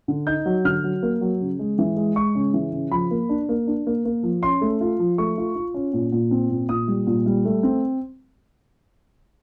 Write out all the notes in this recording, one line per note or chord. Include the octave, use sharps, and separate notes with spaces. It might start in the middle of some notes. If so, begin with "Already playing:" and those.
D3
D#4 G6
F#3
D3 F6
F#3
A#3
F#3
C#3
G#3
E3
G#3
G#3 C#6
C#3
E3
C#3
F3 B5
A#3
D4
A#3
D4
A#3
A#3
F3
C#4 C6
A3
F4
F3
A3 C#6
F4
F4
C#4
A#2
A#2
C4
A#2
A#2 D#6
G3
A#2
G3
A3
C4